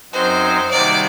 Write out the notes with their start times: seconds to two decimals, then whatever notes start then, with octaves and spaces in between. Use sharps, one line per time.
0.13 F#2 F#3 C4 D#4 F#4 C5
0.70 C3 D#3 G3 A#3 F#4 D5